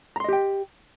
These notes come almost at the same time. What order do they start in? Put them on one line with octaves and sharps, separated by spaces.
A#5 C6 D#5 G4 G5